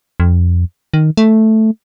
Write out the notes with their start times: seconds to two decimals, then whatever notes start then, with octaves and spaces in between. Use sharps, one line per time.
0.20 F2
0.94 D#3
1.17 A3